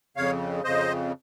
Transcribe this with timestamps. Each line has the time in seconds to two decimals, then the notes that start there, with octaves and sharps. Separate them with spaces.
0.16 F2 C#3 C#5 F5
0.64 F2 C#3 C5 D#5